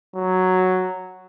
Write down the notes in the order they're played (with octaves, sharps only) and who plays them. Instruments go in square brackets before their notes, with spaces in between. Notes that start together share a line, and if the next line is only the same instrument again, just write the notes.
[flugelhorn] F#3